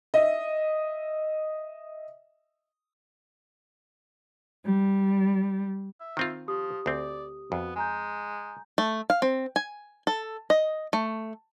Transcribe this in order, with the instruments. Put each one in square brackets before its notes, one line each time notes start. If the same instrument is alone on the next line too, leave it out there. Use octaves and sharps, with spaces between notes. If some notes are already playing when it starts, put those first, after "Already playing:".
[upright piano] D#5 E5
[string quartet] G3
[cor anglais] E5
[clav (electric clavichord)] D#3 C4 F4
[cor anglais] F3 [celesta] G4 D#6
[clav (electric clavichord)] D2 C4 [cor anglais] D5
[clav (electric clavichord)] F2 [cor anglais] B3 [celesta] F#4
[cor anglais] G#3 [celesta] G#5 A#5 G6
[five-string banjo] A3
F5
C4
G#5
A4
D#5
A3